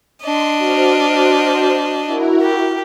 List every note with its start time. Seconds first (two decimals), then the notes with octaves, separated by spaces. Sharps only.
0.23 D4 D#5 C6
0.58 F#4 C5 F6
2.06 E4 F#4 A#4
2.42 G4